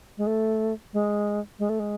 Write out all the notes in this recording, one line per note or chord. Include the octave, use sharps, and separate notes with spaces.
G#3
A3
G#3
G#3
A3
G#3